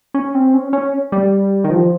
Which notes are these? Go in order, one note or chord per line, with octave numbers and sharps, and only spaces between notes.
C#4
C4
C#4
C#4
G3
D#3
F3